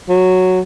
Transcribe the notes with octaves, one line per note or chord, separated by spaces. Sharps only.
F#3